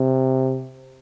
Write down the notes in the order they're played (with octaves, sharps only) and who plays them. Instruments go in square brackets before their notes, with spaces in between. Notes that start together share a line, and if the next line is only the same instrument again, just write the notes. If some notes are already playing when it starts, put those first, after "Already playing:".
Already playing: [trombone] C3